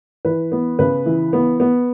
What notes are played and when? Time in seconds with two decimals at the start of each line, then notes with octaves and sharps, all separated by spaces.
0.25 E3 B4
0.52 B3
0.79 C#3 B4
1.06 E3
1.33 B3
1.60 B3